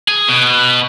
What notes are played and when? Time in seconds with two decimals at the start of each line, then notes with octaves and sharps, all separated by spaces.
0.08 G#4
0.28 B2